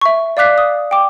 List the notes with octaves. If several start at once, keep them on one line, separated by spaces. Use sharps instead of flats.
E5 C#6
D5 F5 D6 F#6 B6 C7
D#6
G5 D6